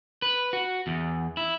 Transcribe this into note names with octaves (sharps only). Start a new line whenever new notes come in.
B4
F#4
E2
E4